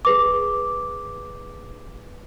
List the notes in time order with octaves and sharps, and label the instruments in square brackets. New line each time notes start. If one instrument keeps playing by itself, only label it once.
[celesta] G#4 B4 D6